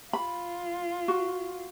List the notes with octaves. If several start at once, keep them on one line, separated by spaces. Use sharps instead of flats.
F4 B5
F#4